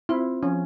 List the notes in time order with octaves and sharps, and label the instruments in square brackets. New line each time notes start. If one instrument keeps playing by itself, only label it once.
[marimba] C4 F4 C5 [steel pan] E4
[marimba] F3 [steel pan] C#4